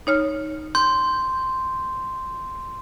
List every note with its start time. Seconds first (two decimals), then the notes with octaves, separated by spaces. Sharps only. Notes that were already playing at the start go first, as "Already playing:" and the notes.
0.07 D#4 C#5 F6
0.75 C6 G6